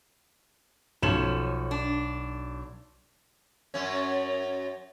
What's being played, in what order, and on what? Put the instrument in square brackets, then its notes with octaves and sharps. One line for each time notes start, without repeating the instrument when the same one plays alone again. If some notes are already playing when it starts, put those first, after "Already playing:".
[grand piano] B1 E7 F#7 [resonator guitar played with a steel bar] F3 C#4 A4
[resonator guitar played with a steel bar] D4
[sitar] F#2 C#4